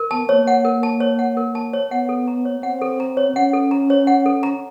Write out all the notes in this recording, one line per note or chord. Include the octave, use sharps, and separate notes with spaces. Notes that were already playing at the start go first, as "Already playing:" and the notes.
Already playing: A#4
B3 A5
A#3 C#5
F#5
A#4
A5
C#5
F#5
A#4
A5
C#5
B3 F#5
A4
A#5
C#5
C4 F#5
A4
A#5
C#5
C#4 F#5
A4
A#5
C#5
F#5
A4
A#5